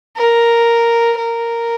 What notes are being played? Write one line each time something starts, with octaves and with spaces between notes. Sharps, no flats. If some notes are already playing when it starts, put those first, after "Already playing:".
A#4
A#4